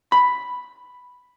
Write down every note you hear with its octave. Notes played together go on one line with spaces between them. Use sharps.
B5